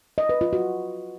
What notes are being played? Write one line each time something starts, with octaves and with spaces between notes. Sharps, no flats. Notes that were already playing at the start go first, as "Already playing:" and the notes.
D#5
B4
F4
F#4